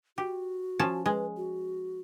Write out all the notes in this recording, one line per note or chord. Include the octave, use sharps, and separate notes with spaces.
F#4 G4
F3 C#4 A5
G#3 B4
F#4